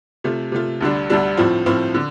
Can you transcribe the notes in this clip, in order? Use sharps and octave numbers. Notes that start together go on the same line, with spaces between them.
C3 A3 F4
C3 A3 F4
D2 D3 G3 D4
D2 D3 G3 D4
A2 F3 C4 F4
A2 F3 C4 F4
D3